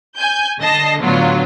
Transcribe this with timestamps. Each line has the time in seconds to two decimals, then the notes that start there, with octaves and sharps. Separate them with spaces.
0.17 G#5 G6
0.60 D3 D#5 A5 A#6 C7
1.01 A2 D3 F#3 B3 F4